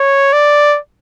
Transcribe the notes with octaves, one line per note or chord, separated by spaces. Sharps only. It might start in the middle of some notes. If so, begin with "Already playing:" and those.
Already playing: C#5
D5